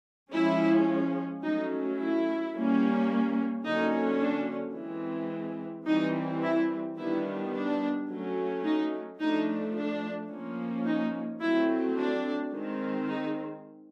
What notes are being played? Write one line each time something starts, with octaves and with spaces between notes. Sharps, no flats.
F3 G#3 C#4 E4
F#3 A3 C#4 D#4
E4
G3 A#3 C#4
D3 F#3 A#3 C#4 D#4
D4
E3 G#3 C4
E3 G3 C4 D#4
E4
D#3 G3 B3 D4 E4
D4
F#3 A3 C#4
D#4
F3 A3 D4 D#4
D4
F3 A#3 C#4
D#4
F#3 A3 C4 E4
D4
D#3 G#3 C4
D#4